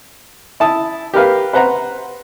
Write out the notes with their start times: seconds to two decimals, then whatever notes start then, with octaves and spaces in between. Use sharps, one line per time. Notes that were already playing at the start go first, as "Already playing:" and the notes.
0.60 E4 A5 D#6
1.13 G4 A#4 B4 F5
1.53 B4 C5 F#5 A#5